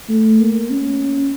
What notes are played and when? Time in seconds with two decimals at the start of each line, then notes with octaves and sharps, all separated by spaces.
0.09 A3
0.40 A#3
0.70 C#4